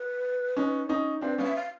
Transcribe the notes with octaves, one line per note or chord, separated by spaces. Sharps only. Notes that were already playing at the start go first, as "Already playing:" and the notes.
Already playing: B4
C#4 D#4
C#4 D#4
C4 D4 B4
B3 C#4 F5
E5
F5